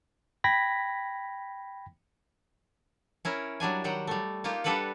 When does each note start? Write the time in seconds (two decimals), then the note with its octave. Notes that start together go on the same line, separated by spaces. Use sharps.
0.44 G5 B5 G#6 A#6 B6
3.25 C#4 E4 A#4
3.60 F#3 G3 D4 G#5
3.84 D#3 F#3 G3 F#5 G5
4.07 G3 A3
4.44 A#3 D#4 F4 G4
4.64 G3 D4 A4 B4 D5 F#5